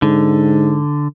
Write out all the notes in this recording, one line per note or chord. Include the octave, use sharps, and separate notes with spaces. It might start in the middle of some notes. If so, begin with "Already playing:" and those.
G#2 D3